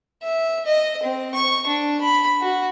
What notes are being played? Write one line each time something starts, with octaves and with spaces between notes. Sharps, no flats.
E5
D#5
C4
C#6
D4
B5
F#4